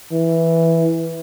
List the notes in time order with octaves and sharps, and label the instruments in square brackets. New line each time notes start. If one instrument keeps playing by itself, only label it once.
[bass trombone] E3